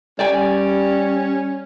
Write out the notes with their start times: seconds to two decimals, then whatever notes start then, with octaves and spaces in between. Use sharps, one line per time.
0.19 G3 C#4 D5 G5 G#5